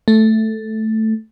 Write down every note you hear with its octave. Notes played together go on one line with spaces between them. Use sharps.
A3